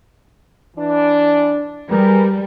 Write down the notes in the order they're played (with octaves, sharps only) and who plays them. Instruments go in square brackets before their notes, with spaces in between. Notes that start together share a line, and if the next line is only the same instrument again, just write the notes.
[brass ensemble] E3 D4
[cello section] G3 [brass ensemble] G#4 A#4 B4